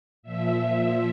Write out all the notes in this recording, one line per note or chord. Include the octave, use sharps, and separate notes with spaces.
A#2 F3 E5